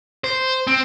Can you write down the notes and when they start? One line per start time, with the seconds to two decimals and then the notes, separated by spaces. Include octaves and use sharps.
0.24 C5
0.67 C4